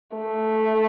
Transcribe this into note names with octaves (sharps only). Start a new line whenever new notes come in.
A3